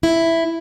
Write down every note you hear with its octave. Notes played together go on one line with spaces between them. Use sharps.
E4